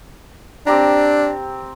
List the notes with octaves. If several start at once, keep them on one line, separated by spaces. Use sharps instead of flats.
C4 D4 G4 A#5